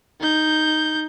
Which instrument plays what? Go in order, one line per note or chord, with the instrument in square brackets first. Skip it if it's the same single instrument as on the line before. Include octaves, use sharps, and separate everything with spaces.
[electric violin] D#4 G6